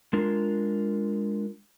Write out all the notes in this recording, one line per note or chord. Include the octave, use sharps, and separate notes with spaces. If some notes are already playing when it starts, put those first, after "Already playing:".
G#3 D4 F4 A#4